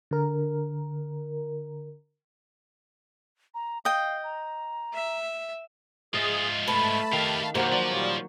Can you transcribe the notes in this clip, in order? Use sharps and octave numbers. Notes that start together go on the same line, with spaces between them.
D3 A#4
A#5
D#5 F5 G5
A#5
E5
G#2 F4 G#4 D#5 E5
A3 B4 A5 B5
D#3 G4 F5
F#2 B2 A#3 F#4 G4 A#4 C5
F3 F#3 D5
A#2 G3 A#3 C#5